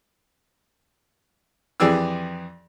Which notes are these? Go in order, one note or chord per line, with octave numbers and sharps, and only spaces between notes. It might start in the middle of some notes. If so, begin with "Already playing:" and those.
F2 E3 G4 G#4 D5 E6